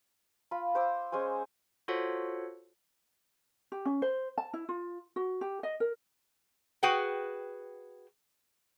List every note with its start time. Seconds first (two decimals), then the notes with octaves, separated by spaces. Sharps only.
0.51 F4 B5
0.75 C5 D6 E6
1.12 G#3 C#4 C5 G#5
1.88 F4 F#4 A4 C5 C#5 F#5
3.72 G4
3.85 C#4
4.02 C5
4.38 A5
4.54 E4
4.69 F4
5.16 F#4
5.41 G4
5.63 D#5
5.80 A#4
6.83 F#4 G#4 B4 F#5 G5